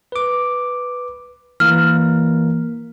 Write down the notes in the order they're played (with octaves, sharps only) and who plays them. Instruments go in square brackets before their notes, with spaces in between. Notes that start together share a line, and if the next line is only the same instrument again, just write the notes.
[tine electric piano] B4 D6
[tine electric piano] E3 A#3 A#4 [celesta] F6